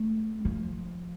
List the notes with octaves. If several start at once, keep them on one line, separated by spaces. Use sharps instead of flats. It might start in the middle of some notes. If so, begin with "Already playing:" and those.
Already playing: A3
F3